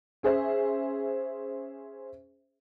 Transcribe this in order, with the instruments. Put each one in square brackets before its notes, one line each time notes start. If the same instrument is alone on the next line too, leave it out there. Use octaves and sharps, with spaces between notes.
[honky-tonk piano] C#4 G#4 C5 E5